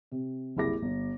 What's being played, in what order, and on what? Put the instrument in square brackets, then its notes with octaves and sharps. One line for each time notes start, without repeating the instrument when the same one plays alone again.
[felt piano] C3
F#1 C2 E4 G#4 D6 A#6
G1